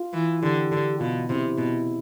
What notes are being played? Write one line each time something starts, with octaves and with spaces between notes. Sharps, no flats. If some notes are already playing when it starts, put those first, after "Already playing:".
Already playing: F4
E3
D3 G4
D3
B2 F4
C3 E4
B2